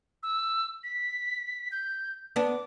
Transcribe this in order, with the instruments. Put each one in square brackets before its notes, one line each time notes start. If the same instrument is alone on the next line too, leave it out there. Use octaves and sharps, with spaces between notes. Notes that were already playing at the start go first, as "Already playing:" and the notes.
[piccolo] E6
B6
G6
[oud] B3 D4 [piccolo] D6